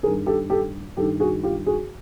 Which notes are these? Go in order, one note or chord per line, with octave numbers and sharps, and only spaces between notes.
G2 D#3 G#4 A#4
G4 A4
G4 A4
G2 D#3 G4 A4
F#4 G#4
F4 G4
F#4 G#4